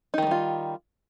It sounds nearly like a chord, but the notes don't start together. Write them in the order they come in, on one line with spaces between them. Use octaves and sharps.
D#4 D#3 A3 G3 F4